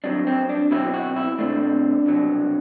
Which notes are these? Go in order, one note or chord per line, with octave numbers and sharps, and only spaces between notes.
G2 F#3 C4 D4
C4
D4
B2 F#3 C4 E4
F#4
E4
B2 A3 C4 D4
C2 B2 F#3